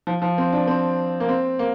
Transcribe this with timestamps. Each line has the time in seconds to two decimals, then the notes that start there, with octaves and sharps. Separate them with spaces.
0.07 F3
0.22 F3
0.38 C4
0.53 D4
0.67 C4
1.20 A#3
1.29 C4
1.59 A#3